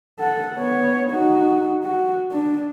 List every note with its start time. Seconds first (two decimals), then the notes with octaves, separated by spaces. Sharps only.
0.20 A4 F#5
0.56 B3 C#5
1.10 D#4 F#4
1.84 F#4
2.32 D4